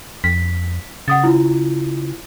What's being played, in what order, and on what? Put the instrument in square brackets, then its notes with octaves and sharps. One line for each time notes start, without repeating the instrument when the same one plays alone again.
[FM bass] F2 [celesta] B6
[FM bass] C#3 [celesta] F#5 D#6 A6
[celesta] E4 F4